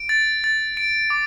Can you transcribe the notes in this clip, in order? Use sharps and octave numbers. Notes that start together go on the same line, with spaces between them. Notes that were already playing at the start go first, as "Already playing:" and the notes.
Already playing: D7
A6
A6
D7
D6